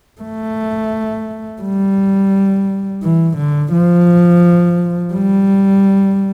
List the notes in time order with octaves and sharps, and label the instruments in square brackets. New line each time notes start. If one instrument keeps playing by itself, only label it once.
[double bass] A3
G3
E3
D3
F3
G3